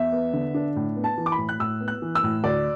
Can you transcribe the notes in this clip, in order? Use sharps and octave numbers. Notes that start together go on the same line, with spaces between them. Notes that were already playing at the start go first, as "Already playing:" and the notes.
Already playing: E2 E5
B3
D3
D4
A2
B3
A5
E3
D6
B5
A2
F#6
A2 E6
B3
F#6
E3
E6
A2
D2 D5